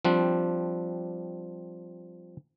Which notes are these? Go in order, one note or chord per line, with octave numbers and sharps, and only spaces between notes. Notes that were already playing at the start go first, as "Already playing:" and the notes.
F3 G3 C4 D4